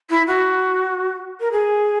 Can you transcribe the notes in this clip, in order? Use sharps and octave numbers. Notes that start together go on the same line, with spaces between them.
E4
F#4
A#4
G#4